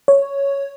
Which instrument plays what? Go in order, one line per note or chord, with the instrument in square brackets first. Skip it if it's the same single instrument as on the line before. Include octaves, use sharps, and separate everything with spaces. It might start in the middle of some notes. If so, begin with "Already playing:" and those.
[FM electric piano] C#5